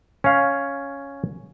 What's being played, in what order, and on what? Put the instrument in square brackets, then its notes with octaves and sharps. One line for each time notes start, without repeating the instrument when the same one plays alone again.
[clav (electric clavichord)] C#4 F5